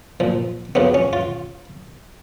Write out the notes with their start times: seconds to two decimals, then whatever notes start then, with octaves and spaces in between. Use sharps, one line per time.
0.20 A#2 F3
0.75 F#2 C#3 F3 B3
0.94 C#4
1.13 F4